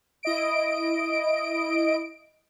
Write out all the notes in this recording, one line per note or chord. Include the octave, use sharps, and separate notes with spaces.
E4 D#5 D7